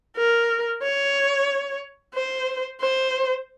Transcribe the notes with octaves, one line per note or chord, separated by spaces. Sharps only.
A#4
C#5
C5
C5